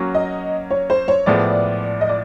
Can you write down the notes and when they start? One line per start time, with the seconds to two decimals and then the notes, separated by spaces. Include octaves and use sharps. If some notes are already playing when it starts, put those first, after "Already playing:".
Already playing: F#3 A#3 C#4 F#4
0.14 D#5
0.71 C#5
0.90 C5
1.08 C#5
1.26 A2 F3 G#3 B3 D5
2.01 D#5
2.09 D5